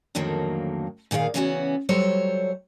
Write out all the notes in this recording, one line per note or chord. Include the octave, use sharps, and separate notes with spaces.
F2 A2 D3 D#3 F#3 A#3
A#2 D#3 G#4 C#5 F5
C#3 E3 B3 C#4 D4 F#4
F#3 G3 A4 C5 C#5